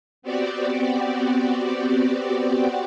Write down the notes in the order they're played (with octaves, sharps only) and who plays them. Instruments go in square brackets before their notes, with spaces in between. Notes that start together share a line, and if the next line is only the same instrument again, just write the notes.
[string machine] B3 C4 F#4 G4 D5